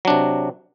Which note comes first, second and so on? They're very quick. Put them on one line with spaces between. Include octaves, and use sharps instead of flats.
F#3 D4 C3